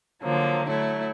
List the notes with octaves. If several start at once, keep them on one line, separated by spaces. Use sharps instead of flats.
D3 F3 F#3 A#3
F#3 A3 E4